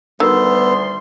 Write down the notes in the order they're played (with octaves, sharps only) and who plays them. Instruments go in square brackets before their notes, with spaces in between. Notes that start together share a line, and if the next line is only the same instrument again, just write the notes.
[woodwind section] D2 G3 C6 [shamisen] D#3 [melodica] B3 [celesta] E6